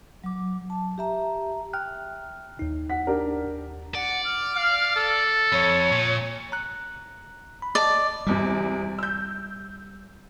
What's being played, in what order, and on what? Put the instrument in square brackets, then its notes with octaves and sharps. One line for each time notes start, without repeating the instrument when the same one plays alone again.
[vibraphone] F#3 D6
A5
G4 E5 A#5
[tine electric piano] G5 F6 F#6
D#2 D#4
[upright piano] F#5 B6
D4 G4 A#4
[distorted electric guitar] D5 [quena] F#5
[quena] F6
[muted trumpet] F5
A4
[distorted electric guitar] F2 [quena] C#5
[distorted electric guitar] A#2
[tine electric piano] A#5 F#6
B5
[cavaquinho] D5 [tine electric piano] D#5 A5
[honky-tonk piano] G#1 E2 C3 [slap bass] G3
[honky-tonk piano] E6 G6